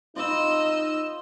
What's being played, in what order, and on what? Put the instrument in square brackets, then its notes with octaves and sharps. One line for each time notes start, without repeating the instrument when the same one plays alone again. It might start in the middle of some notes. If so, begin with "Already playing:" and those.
[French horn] D#4 [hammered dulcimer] F4 C5 B5 [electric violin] D#5 E6